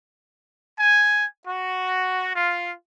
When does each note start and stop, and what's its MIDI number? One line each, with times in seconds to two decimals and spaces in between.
0.79 1.26 80
1.48 2.34 66
2.35 2.73 65